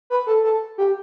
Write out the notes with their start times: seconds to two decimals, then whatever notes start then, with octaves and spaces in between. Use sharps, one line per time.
0.10 B4
0.27 A4
0.44 A4
0.78 G4